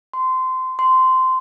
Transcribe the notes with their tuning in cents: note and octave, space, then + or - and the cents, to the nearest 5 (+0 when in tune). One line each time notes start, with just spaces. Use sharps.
C6 -20
C6 -15